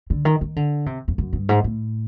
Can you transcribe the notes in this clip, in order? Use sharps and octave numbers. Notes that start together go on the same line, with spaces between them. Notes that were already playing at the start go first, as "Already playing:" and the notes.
D3
D#3
D#3
D3
C3
F2
F#2
G2
G#2
A2